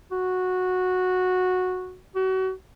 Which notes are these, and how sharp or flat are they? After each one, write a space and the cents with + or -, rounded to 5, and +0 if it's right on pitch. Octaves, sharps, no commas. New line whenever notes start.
F#4 -10
F#4 +35